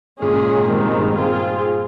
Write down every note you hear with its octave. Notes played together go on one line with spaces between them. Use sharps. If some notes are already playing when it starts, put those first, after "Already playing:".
A#2 C#3 G#3 C#4 G#4
A#2 C#3
C#3
G#2 C3
G#2 D#3 G#3 C4 D#4
G2
G#2
G#2
G2 A#2 C4 F4 G#4